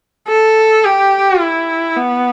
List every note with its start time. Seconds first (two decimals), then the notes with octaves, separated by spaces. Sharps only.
0.28 A4
0.85 G4
1.41 E4
1.97 B3